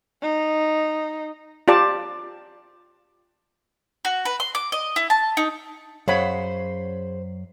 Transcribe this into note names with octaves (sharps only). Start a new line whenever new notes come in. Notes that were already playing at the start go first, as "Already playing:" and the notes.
D#4
F4 G4 D5 A5
F#4
B4
C6
D6
D#5
E4
A5
D#4
F#2 G#4 C5 C#5 F5 F#5 B5